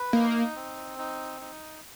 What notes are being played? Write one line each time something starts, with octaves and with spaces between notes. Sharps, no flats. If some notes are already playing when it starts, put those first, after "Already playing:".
Already playing: B4
A#3 D#4
C4
D#4
D#4